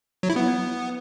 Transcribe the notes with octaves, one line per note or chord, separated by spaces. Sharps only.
F#3
E4
B3